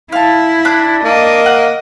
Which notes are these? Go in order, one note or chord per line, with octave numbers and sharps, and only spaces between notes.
E4 F5 A5
D4 F#6
A#3 D#5
F#5